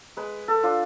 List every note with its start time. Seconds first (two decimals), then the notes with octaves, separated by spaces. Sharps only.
0.17 G#3 B4
0.48 A4
0.63 D4 F4